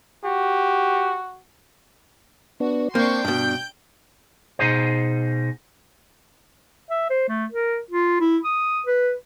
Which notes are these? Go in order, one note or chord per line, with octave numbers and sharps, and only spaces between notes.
F#4 G4
B3 D4 F#4
A#3 C4 D4 G5 C6 C#6
G2 B2 D4 G6 D7
B2 D#4 G#4 C5
E5
C5
A3
A#4
F4
E4
D#6
B4